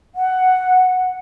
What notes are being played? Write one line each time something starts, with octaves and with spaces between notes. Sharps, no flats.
F#5